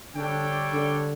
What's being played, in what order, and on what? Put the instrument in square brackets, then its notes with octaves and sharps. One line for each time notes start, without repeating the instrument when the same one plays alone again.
[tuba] D3 [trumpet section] G3 D4 A4 C#5 G5
[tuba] D3